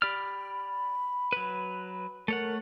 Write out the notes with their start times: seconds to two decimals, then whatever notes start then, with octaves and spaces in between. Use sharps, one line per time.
0.02 G4 D5 B5 F6
1.32 F#3 B4
2.28 A3 A#4 C#5 F#5